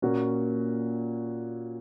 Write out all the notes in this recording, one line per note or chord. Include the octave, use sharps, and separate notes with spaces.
A#2 A#3 C#4 F#4